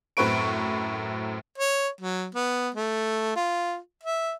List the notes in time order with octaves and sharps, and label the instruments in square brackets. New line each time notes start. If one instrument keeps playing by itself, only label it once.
[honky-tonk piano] F#2 A2 C4 B4 C#6 D7
[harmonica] C#5
F#3
B3
A3
F4
E5